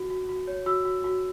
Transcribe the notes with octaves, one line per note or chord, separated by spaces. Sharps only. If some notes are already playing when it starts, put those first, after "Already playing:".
Already playing: F#4
F#4
F#4
C#5
F#4 E6
F#4
F#4